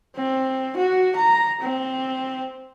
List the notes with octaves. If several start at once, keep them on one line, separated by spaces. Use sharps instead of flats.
C4
F#4
A#5
C4